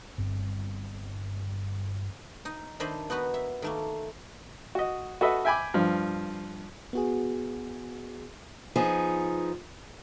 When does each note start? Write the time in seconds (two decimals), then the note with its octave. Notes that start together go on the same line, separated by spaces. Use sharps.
0.18 G1 G2 C4
2.45 D#4
2.80 D#3 D4 C5 D#5 E5 B5
3.10 B3 D#4 F#4 B4
3.34 E5
3.62 D#3 A3 A#3
4.75 F#4 D#5
5.21 F#4 A4 B4 D#5 E5
5.45 E5 G5 G#5 B5 D6
5.74 G2 F3
6.93 B3 F#4 G#4
8.76 F3 B3 D#4 G#4